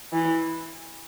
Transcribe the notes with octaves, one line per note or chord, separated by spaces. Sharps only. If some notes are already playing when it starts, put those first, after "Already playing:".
E3